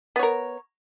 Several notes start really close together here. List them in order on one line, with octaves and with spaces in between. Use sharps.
B3 C#5 A#4